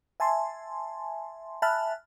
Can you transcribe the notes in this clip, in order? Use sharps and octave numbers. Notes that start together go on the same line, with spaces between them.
E5 G#5 A5 C6
E5 G#5 A5 B5 F6 F#6